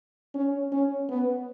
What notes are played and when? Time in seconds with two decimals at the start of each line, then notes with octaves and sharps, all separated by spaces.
0.35 C#4
0.72 C#4
1.09 B3